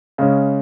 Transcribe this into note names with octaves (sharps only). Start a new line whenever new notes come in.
C#3 G#3 C#4